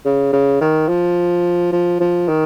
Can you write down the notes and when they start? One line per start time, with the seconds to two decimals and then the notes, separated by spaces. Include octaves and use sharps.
0.05 C#3
0.32 C#3
0.61 D#3
0.88 F3
1.72 F3
2.00 F3
2.28 D#3